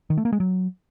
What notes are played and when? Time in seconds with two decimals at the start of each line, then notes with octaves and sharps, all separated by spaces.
0.10 D#3
0.18 A3
0.25 A#3
0.32 G#3
0.40 F#3